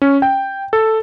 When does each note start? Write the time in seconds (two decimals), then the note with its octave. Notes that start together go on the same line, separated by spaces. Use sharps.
0.02 C#4
0.22 G5
0.73 A4